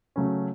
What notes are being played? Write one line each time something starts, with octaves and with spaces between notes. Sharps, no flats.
C#3 F#3 A3 C#4